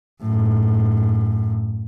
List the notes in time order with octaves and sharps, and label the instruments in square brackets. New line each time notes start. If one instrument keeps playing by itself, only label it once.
[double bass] F#2 A2